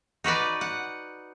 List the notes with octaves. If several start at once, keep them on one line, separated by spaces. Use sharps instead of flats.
D#4 F#4 B4 D5
F#5